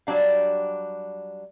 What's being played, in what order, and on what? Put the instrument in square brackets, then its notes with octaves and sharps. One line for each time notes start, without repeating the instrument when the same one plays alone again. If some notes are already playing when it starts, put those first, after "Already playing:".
[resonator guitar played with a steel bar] F#3 G3 D4 F5